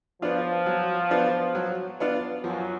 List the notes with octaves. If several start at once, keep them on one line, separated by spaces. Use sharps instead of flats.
F3 B3 D4 F4
F#3
B3 D4 F4
F#3
B3 D4 F4
F#2 F3 F#3